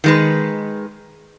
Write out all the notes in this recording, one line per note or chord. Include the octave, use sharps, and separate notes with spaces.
D#3 G#3 B4